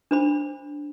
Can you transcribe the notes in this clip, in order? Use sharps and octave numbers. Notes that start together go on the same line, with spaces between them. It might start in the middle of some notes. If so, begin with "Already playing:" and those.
D4 C5 B5